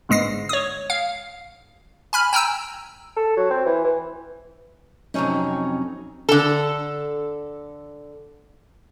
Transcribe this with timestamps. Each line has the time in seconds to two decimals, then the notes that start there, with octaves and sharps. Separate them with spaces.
0.09 G1 G#2 G#3 A#6 C7
0.49 C#5 D#6
0.90 F5
2.13 G#5 B5 F6
2.33 G5 G#5 A#5 E6
3.17 A4
3.37 F#3
3.50 C4
3.66 E3
3.84 E3
5.14 F2 C3 F#3 C#4 D#4
6.29 D3 A4